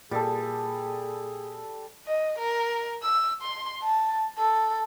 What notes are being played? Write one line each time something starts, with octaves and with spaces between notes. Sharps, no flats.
A#2 G3 G#4 A4
D#5
A#4
E6
C6
A5
A4